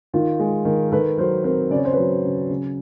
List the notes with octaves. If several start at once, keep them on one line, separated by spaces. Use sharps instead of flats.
D#3 D#4 F4
G#3
D#3
A#4
D#3 A4 B4
F#3 A#4 C5
C4 A#4 C5
C#3 D5
C#5
C5
F#3 B4 C#5
C#3
C#3